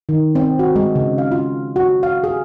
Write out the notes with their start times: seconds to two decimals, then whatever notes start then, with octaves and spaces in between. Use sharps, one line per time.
0.09 D#3
0.35 C4
0.59 F#4
0.76 G#3
0.96 C#3
1.18 F5
1.32 F4
1.76 F#4
2.03 F5
2.24 G#4